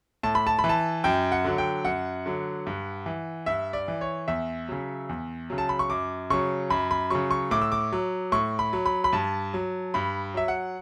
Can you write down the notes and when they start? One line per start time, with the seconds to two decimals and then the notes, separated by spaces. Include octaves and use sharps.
0.23 A2 A5
0.35 B5
0.47 A5
0.59 B5
0.64 E3
0.69 A5
1.04 F#2 G5
1.32 F#5
1.45 D3 F#3
1.58 G5
1.85 F#2 F#5
2.26 D3 F#3
2.67 G2
3.06 E3
3.46 G2 E5
3.73 D5
3.88 E3
4.01 C#5
4.28 E2 E5
4.68 C#3 F#3
5.09 E2
5.50 C#3 F#3
5.58 A5
5.69 B5
5.79 C#6
5.90 F#2 D6
6.30 C#3 F#3 C#6
6.70 F#2 B5
6.91 B5
7.10 C#3 F#3 C#6
7.31 C#6
7.51 A2 D6
7.61 E6
7.72 D6
7.92 F#3
8.32 A2 C#6
8.59 B5
8.73 F#3
8.86 B5
9.04 B5
9.13 G2 A5
9.54 F#3
9.94 G2 B5
10.34 F#3 E5
10.48 F#5